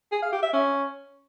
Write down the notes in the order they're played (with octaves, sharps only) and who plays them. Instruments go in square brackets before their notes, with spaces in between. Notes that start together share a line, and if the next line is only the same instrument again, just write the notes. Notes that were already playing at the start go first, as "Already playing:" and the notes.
[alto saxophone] G#4
F5
G4
E5
C#4